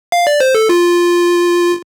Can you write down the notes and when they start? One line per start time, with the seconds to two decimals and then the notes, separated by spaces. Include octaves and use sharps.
0.12 F5
0.27 D5
0.40 C5
0.55 A4
0.69 F4